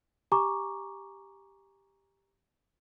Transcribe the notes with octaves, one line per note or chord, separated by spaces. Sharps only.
G4 G#5 A#5 C#6 D6